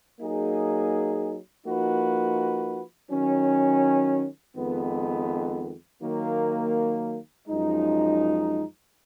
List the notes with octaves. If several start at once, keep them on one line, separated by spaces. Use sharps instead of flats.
F#3 A#3 D#4 G#4
F3 A#3 D#4 F#4 B4
D#3 F#3 C#4
F2 D#3 G#3 B3
D#3 F#3 A#3
F#2 F3 G#3 D#4